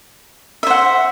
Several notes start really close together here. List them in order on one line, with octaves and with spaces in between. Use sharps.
E5 C5 F#5